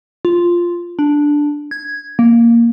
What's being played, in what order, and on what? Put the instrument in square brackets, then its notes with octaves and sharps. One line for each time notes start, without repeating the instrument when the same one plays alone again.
[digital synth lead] F4
D4
G#6
A#3